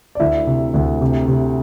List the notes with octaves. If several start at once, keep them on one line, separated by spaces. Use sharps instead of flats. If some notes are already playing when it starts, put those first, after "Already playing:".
D5
D2 E4 E5
C3
D2
C3
C3